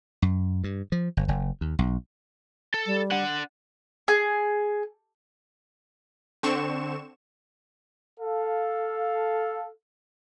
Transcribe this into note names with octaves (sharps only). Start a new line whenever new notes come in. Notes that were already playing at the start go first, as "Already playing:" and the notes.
F#2
G2
F3
G1
F#1
D#2
B1
A4
G3
D4 F#5
G#4
D3 C4 C#6 E7
A4 F5